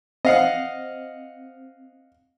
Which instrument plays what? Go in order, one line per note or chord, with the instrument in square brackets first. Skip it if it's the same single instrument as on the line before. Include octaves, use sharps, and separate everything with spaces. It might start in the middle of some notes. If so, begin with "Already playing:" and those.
[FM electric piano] C4 [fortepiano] D#5 F5 F#5